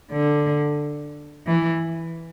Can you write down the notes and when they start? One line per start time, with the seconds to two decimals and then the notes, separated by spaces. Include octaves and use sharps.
0.12 D3
1.46 E3